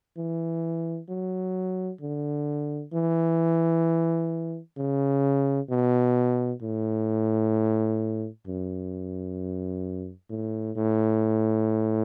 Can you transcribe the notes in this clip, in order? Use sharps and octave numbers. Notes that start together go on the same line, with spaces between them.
E3
F#3
D3
E3
C#3
B2
A2
F#2
A2
A2